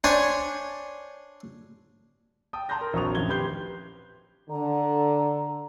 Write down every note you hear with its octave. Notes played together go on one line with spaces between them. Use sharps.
D4 C5 C#5 G#5
G5 A5 D#6
A5 A#5 C6 F#6 G6 A#6
A#4
A#1 F2 F#3 C#6 D#6 F7
A1 F2 D#3 G#6 G7
G4 B4 C6 G6 C7 G7
D3 A#5